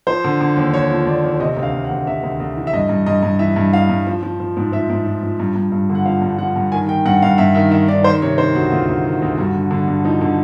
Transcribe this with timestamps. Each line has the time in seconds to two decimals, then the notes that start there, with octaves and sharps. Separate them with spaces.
0.07 F3 C5
0.24 D3
0.41 D3
0.56 D#2
0.74 D#2 C#5
0.90 F3
1.06 D#2 D5
1.23 D#2
1.40 C3 D#5
1.56 D2
1.63 F5
1.73 D2
1.85 F#5
1.90 D2
2.07 C3 E5
2.23 D2
2.40 D2
2.57 E3
2.67 E5
2.73 G2 D#5
2.89 G2
3.06 G2 D#5
3.23 G2
3.39 E3 E5
3.56 G2
3.73 E3 F5
3.89 G2
4.07 F3
4.23 F3
4.40 F3
4.57 G#2
4.72 F3 E5
4.89 G#2
5.06 F3
5.23 F3
5.40 G2
5.56 G2
5.72 G2
5.89 D3
5.95 F#5
6.06 F3 F5
6.22 G2
6.38 F3 F#5
6.56 G2
6.72 D#3 G#5
6.89 D#3 G5
7.06 G2 F#5
7.22 G2 F5
7.38 G2 E5
7.55 D#3 E5
7.71 D#3 E5
7.88 D#3 D5
8.04 D#3 C5
8.22 C3 C#5
8.38 D#3 C5
8.55 D2 F#4
8.72 D2 F4
8.89 D2
9.05 D#3
9.22 D2
9.37 G2 F#4
9.54 D3
9.71 D3
9.87 G2
10.04 F3 D#4
10.21 D3